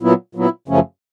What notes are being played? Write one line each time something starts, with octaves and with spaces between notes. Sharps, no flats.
A#2 F#3 B3 E4
A#2 F#3 B3 E4
F#2 C#3 F3 A3 C#4